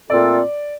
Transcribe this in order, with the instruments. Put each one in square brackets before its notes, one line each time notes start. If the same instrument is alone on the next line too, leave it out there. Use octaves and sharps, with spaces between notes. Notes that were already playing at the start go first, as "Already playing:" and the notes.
[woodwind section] A#2 A3 C4 F4 A4 [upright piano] D5